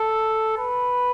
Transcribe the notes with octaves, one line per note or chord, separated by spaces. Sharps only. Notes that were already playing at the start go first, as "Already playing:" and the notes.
Already playing: A4
B4